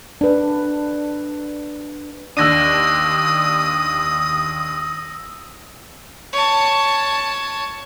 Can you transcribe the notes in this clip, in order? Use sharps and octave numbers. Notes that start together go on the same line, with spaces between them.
D4 B4
D#2 D4 D#6 E6 A#6 D#7
C#5 A5